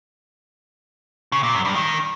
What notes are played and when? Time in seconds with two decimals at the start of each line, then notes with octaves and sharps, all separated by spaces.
1.32 C#3
1.43 A#2
1.54 F#2
1.65 G2
1.76 D#3